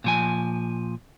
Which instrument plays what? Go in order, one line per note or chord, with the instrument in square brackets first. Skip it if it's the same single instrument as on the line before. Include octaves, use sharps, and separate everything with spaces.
[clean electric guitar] A#2 F3 G#5